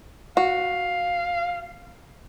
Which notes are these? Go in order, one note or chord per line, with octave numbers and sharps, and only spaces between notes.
F#4 F5